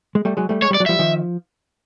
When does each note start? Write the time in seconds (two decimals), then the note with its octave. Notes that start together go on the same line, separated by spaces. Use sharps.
0.15 G#3
0.25 G3 A3
0.37 F#3 G#3
0.49 G3 A3
0.62 G#3 C#5
0.70 G3 D5
0.80 F#3
0.86 F3 G3 E5
0.99 D#3 F3